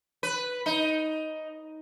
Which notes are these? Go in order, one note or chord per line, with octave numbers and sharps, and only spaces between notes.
B4
D#4